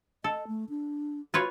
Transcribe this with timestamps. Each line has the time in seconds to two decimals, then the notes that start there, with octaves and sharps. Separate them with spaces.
0.24 A4 D#5
0.48 A3
0.69 D4
1.34 F4 F#4 B4 C#5